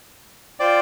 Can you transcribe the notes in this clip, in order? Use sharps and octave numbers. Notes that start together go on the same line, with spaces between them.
F4 C5 D5 G5